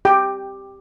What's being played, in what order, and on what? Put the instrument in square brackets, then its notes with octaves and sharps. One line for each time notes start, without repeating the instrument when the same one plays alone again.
[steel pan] G4 G5